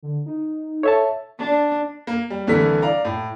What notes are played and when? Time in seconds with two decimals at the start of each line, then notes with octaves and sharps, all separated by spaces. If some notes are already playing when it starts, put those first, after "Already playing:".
0.02 D3
0.26 D#4
0.83 A4 C#5 E5 A5
1.38 D4
2.07 A#3
2.30 G3
2.47 C2 D3 E3 A3 A#4 B6
2.82 D5 F5 A#5
3.05 A2